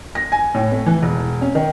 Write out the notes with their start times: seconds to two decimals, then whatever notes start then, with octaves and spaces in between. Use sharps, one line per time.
0.15 A#6
0.32 G#5
0.55 A2
0.72 A3
0.86 E3
1.03 E1
1.42 C#4
1.55 D#3